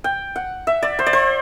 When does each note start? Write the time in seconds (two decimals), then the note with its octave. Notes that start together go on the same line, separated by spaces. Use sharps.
0.04 G5
0.36 F#5
0.67 E5
0.83 D5
0.99 C5
1.06 D5
1.13 C5